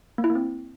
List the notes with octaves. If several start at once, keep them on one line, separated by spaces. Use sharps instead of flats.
A#3
E4
A#3
C4